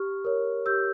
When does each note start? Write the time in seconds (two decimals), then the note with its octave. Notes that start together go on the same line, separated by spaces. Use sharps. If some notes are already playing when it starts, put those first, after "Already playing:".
Already playing: G4 C#6 F6
0.25 A#4 C#5
0.66 G4 E6 G6